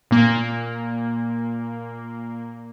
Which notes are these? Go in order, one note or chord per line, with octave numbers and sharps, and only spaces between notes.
A#2 A#3